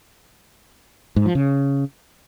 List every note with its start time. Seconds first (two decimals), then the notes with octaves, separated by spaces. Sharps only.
1.16 G#2
1.26 F3
1.35 C#3